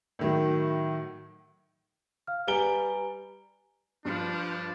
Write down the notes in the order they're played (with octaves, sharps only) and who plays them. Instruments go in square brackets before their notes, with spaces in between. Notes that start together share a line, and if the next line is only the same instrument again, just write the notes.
[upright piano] A2 D#3 F#3
[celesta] F5 F6
[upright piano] G3 D7 G7 [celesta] B4 G#5 A#5
[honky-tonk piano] G2 [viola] F3 [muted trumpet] D4